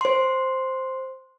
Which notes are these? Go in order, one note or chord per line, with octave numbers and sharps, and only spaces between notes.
C5 C6